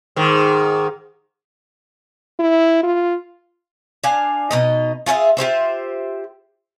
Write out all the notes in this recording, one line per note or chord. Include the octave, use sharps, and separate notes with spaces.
G#2 D#3
E4
F4
D4 F5 G#5
B2 D#4 D#5
F4 G#4 C5 E5
F4 G4 C5 E5